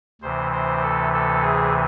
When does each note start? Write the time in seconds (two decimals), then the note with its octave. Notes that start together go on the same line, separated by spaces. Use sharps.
0.21 D2 C3 E3 C5
0.52 C5
0.82 A4
1.13 A4
1.42 G#4